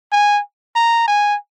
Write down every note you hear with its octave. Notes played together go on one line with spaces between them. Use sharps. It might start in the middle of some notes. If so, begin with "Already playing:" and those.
G#5
A#5
G#5